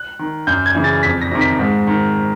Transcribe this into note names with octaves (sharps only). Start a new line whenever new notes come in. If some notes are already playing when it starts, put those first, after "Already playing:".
Already playing: F#6
D#3
F#2 G6
G#6
C#3 E3
A6
F2 B6
A#6
C3 D#3
B6
G#2
D#3